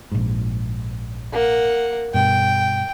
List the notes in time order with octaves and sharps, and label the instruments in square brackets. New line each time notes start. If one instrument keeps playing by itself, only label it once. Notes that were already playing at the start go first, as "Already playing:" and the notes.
[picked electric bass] A#1 G#2
[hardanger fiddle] A#3 F#5
[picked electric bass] G2 B2 [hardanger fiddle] G5